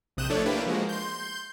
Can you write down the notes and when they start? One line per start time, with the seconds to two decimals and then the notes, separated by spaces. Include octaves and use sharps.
0.17 A#1 C3 D#6 F#6 G6 E7
0.29 F3 A3 D4 A4 C#5 D5
0.45 A#3 D4 E4 G4 B4
0.66 F3 G#3 A#3 F#4
0.89 C6 G6